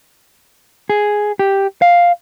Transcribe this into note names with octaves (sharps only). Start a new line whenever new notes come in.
G#4
G4
F5